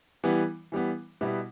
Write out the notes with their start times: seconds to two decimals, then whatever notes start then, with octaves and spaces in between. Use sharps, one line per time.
0.24 E3 G3 B3
0.72 E3 G3 B3
1.21 B2 G3 B3 E4